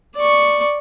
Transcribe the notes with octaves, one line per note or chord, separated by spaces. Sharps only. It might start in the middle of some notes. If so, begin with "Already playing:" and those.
D5 C#6